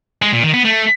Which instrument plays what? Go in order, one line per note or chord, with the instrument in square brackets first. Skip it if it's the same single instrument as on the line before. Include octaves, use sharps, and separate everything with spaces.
[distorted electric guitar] G#3
A#2
D#3
B3
A3